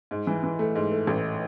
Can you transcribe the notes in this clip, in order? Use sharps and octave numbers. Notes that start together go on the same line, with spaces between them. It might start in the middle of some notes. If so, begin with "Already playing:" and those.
G#2
E3
E3
A3
G#2
A3
A1